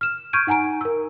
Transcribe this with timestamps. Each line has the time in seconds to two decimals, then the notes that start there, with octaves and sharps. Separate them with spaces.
0.01 F6 E7
0.33 C#6 F6 G6 G#6 D7 D#7
0.47 D#4 F#5 G#5 A#5 D7
0.81 A#4 E6